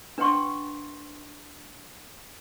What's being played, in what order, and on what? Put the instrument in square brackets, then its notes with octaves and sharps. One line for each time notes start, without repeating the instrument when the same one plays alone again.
[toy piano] D4 B4 F#5 G5 C6 C#6